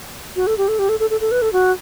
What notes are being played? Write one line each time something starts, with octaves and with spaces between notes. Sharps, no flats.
F#4
A4
G4
A4
G4
A4
A4
A4
A4
B4
A4
F#4